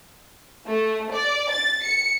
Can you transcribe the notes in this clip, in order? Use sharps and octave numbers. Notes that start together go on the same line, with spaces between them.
A3
D5
A6
C#7